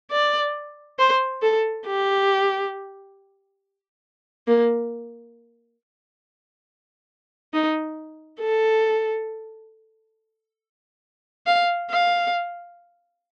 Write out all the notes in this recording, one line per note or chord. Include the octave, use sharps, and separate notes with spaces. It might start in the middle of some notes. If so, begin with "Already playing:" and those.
D5
C5
A4
G4
A#3
D#4
A4
F5
F5